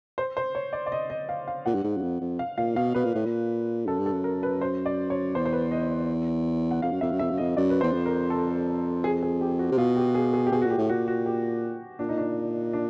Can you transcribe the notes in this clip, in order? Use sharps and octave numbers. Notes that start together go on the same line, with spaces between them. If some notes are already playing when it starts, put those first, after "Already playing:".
C5
C5
C#5
D5
D5
D#5
D#5
F5
F5
A#2 F#5
G2
G#2
F#2
F2
F2
F5
A#2 F5
B2 F5
B2 B4
A#2
A2
A#2
F#2 A4
G2
A4
F#2
A#4
B4
C5
D5
C#5
E2 C5
C5
B4
D#5
F#5
F2 F5
F#2
F2 E5
F#2
F2 E5
F#2
F2 D#5
F#2 D5
B4
E2 C5
F2
A#4
A4
G#4
G#4
G4
F#4
C3
B2 F4
G4
G#4
G#4
G4
B2 G#4
A#2 F#4
G4
A2
A#2 F#4
F#4
G4
A#2 D4
D#4
D4
D4